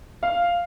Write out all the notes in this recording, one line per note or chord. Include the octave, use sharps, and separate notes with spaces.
F5